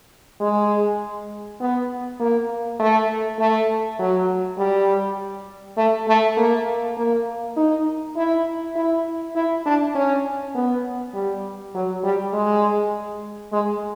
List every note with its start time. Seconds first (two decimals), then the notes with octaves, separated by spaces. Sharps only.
0.40 G#3
1.60 B3
2.20 A#3
2.79 A3
3.39 A3
3.99 F#3
4.58 G3
5.77 A3
6.08 A3
6.37 A#3
6.97 A#3
7.57 D#4
8.16 E4
8.75 E4
9.35 E4
9.66 D4
9.95 C#4
10.55 B3
11.14 G3
11.74 F#3
12.04 G3
12.33 G#3
13.52 G#3